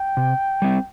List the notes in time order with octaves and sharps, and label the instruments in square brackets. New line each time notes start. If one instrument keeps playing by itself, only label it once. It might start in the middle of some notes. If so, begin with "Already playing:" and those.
Already playing: [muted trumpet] G5
[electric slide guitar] C3
G3 C4